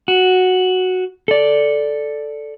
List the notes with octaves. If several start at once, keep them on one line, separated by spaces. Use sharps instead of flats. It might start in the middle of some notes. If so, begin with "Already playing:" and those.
F#4
A4 D5